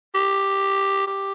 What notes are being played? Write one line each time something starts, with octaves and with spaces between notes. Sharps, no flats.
G4
G4